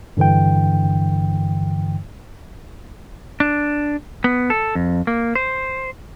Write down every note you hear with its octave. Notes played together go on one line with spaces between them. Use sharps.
G2 D3 E3 G5
D4
B3
A4
F2
A#3
C5